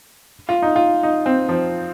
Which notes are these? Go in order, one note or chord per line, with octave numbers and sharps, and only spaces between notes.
F4
D#4
F4
D#4
C4
F3